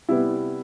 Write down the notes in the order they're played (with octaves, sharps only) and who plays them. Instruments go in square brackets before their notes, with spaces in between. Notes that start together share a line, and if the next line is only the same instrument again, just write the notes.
[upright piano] C3 G3 B3 E4